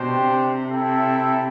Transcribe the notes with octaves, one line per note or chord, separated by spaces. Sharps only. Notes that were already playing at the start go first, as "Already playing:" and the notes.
Already playing: B2 D4 G4 C5 G5
C3
E4 A4 E5 G5